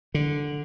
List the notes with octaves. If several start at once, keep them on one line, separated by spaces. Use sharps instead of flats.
D3